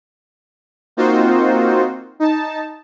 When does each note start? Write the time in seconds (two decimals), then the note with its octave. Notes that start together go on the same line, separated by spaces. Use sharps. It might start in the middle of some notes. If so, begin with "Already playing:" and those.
0.97 A#3 C4 D#4 F4 F#4 C5
2.20 D#4 A5